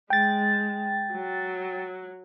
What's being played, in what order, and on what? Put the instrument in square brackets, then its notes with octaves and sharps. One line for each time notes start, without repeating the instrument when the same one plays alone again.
[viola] G#3 [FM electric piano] G5 A6
[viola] F#3